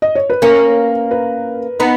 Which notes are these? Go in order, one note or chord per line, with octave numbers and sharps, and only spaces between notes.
D#5
C#5
B4
A#3 C#4 A#4
B4
B3 D#4